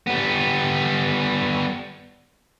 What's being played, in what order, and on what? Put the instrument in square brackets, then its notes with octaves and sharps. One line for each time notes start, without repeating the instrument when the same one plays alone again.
[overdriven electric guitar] G3 B3